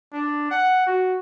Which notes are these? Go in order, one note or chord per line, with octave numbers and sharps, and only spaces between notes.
D4
F#5
F#4